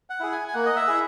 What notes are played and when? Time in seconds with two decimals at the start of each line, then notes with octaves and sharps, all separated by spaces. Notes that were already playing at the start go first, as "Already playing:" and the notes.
0.10 F#5
0.20 E4 G#4
0.32 G#5
0.48 G#5
0.54 A#3 F#5
0.66 D#5
0.76 E5
0.87 E4 G#4